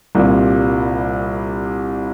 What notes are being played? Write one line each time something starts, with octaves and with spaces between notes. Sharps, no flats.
C2 A#2 G3